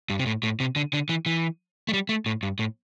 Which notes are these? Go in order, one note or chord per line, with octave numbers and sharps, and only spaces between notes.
G2
C3
A2
A2
C3
D3
D3
E3
E3
A3
G3
A3
A2
G2
A2